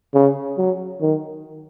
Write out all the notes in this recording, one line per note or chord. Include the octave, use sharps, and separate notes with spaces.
C#3
F#3
D#3